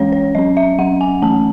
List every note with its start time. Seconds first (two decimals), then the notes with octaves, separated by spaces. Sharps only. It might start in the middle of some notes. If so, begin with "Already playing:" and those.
Already playing: E3 G#3 C#4 C#5
0.12 C#5
0.35 F#3 C#4 D#5
0.57 E5
0.78 F#3 C#4 F#5
1.01 G#5
1.22 E3 A3 C#4 A5